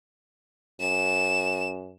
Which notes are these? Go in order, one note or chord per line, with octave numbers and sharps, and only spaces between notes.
F#2 E7